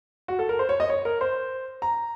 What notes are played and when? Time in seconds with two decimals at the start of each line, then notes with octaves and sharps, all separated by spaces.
0.28 F#4
0.39 A4
0.49 A#4
0.59 C5
0.69 C#5
0.80 D#5
0.90 C#5
1.05 A#4
1.21 C5
1.82 A#5